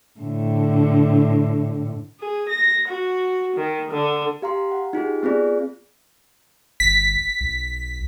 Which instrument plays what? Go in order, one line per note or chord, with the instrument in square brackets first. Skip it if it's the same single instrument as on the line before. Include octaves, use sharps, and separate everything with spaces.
[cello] A2 D3
[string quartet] G#4
A#6
F#4
D#3
D3
[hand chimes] G4 F5 A#5 C6
F#5
D#4 F4 G4 G#4
B3 C4 F4 G#4 D5
[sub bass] G1 [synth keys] B6
[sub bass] B1